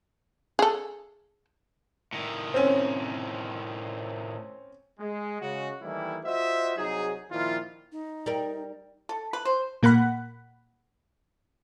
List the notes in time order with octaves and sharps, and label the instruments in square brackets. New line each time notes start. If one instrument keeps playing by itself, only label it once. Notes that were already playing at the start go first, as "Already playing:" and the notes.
[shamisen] G#4 A4
[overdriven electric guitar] A2 D#3
[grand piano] C4 C#4
[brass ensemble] G#3
C#3 G#3 F#4
D#3 E3 G3 A3 A#3 E4
F4 F#4 C5 D#5 E5
C2 F#3 D#4 G#4
A#2 D#3 F3 E4 F4
[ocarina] D#4
[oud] G3 A#4
[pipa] A4
B4
C5
[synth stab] A#2 A#3 F#5 B5